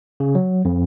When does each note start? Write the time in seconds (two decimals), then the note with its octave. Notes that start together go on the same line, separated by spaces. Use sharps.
0.20 C#3
0.35 F#3
0.65 F2